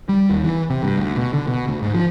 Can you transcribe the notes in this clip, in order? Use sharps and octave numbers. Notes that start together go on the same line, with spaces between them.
G3
D#2
E3
C3
G2
D2
B2
D3
B2
D2
G#2
F3